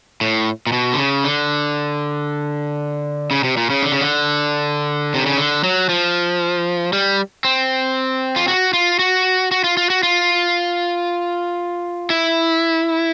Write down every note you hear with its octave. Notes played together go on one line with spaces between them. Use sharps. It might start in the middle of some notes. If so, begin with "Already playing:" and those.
A2
A#2
B2
D3
C#3
D3
C#3
C3
A#2
C#3
D3
C#3
D3
C3
C#3
D3
F#3
F3
G3
C4
F4
F#4
F4
F#4
F#4
F4
F4
F#4
F4
E4